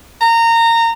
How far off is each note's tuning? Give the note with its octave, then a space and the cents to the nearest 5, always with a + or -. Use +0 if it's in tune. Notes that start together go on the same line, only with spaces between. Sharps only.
A#5 -20